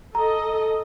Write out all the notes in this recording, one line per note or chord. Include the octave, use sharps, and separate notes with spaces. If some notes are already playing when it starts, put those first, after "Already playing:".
A4 D#5 A#5